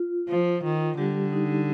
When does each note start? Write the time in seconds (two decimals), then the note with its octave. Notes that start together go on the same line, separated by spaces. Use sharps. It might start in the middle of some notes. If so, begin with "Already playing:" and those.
Already playing: F4
0.29 F3
0.64 D#3
0.98 D3 G3 G4
1.33 D#4